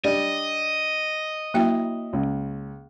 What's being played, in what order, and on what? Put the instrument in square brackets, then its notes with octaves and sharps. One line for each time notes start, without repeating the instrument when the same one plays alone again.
[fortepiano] G3 D4 D5 [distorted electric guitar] D#5
[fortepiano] F#3 E4 [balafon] A#3 G5
[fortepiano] C#2